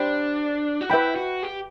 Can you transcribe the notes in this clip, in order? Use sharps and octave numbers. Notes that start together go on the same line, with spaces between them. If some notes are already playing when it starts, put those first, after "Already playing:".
Already playing: D4 G4 C5 G5 B5
F#4
E4 B4 E5 G5 B5
F#4
G4